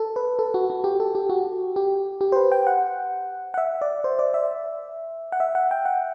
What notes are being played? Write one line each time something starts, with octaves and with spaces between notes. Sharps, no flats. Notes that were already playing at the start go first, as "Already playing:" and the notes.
Already playing: A4
B4
A4
F#4
F#4
G4
A4
G4
F#4
G4
G4
C5
B4
G5
F#5
F#5
E5
D5
C5
D5
E5
F#5
E5
F#5
G5
F#5